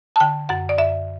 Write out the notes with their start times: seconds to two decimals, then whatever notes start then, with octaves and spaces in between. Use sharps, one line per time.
0.16 A5
0.20 D3 G5
0.49 F#2 F#5
0.69 D5
0.78 F#2 E5